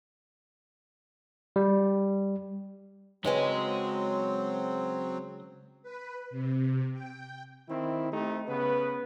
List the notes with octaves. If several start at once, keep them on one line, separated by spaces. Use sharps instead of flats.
G3
C#3 F#3 G#3 C4 B4 D#5 G#5
B4
C3
G5
D#3 C4 E4
A3 C4 D#4 G4
C#3 B3 B4